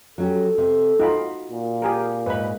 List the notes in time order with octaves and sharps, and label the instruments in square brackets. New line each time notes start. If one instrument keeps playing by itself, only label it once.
[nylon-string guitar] F#3 C#4 G4 [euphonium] A4
[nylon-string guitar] C3
[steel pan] D#4 F4 B5 [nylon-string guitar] F#4
[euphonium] A#2
[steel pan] G4 G#4 A#4
[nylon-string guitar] G#2 [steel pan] B4 B5